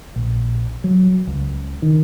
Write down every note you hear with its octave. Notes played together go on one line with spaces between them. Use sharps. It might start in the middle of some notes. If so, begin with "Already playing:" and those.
A#1
F#3
C#2
D#3